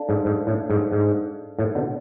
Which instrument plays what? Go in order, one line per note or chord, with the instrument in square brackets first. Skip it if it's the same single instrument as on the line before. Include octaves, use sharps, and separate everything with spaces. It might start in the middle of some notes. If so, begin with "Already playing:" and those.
Already playing: [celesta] D4 A4 D5 F5 A5
[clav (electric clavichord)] G#2
G#2
A2
G#2
G#2
A2
B2 D3